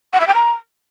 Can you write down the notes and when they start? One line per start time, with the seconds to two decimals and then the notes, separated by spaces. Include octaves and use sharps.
0.13 F#5
0.20 E5
0.27 G5
0.34 A#5